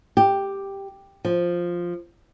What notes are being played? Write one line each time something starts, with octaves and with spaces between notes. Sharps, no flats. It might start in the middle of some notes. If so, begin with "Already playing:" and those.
G4
F3